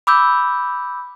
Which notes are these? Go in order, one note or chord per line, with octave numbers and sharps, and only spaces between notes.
B5 D6 E6 G6